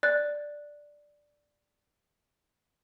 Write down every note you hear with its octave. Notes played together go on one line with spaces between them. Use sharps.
D5 F#6 A6